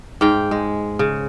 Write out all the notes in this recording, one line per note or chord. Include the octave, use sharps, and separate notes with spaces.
G#2 F5 G5
G#3
C#3